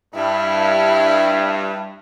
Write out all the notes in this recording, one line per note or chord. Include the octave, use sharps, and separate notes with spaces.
G2 E4